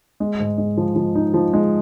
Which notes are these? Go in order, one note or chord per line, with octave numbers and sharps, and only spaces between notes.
G#3
G#2
G#3
F3
F3
D#4
F3
G#3